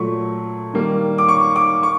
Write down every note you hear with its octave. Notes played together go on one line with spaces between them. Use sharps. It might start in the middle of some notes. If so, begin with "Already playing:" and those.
Already playing: A#2 F#3 A3 C#6
D#3 G3 A#3
D6
C#6
D6
C#6